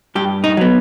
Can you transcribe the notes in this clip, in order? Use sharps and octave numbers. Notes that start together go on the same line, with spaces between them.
G2 G4
D#4
F#3 B3